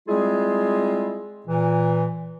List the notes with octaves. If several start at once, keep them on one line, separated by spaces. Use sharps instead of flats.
G3 G#3 C4 E4 F4 G#4
A#2 E3